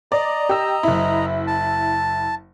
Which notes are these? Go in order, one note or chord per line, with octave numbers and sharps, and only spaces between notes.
D5 D#5 A#5
G4 E6
F#1 E4
A5